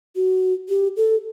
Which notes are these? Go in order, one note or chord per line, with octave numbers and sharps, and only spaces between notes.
F#4
G4
A4